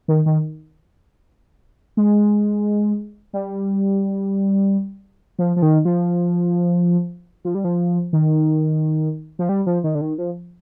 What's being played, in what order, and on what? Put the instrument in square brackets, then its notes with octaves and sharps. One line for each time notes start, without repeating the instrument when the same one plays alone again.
[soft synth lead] D#3
D#3
G#3
G3
F3
F3
D#3
F3
F3
G3
F3
D#3
F3
G3
F3
D#3
D3
D#3
F3